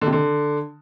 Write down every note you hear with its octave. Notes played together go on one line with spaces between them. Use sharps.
D3
C3
D3